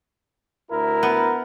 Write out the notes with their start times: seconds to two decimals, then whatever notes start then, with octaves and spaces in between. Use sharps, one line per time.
0.71 D2 E4 A#4
1.03 B3